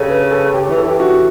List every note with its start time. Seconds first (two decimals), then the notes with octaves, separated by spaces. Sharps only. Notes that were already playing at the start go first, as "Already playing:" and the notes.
Already playing: C#3 G4 A4
0.08 B4
0.31 A4
0.54 G4
0.66 C#5
0.69 E3
0.77 A4
0.84 E3 G4
1.00 F#4